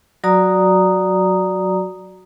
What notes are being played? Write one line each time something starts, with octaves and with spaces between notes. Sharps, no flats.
F#3 F#4 D5 A#5 D#6